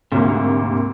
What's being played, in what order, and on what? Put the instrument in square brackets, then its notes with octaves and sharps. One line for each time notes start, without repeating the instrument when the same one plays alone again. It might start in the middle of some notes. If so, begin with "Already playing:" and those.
[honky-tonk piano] D2 C3 A#3 [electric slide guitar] G#2